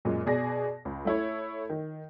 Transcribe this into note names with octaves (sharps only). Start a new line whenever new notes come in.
F#2 A#2 G#3
B2 G#4 D5 A#6
C#2
A3 E4 C#5
D#3